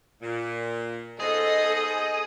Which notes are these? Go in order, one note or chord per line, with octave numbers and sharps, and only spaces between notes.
A#2
B3 D#4 G#4 A4 C5 D#5